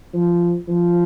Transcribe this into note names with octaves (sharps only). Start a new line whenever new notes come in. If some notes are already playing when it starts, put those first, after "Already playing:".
F3
F3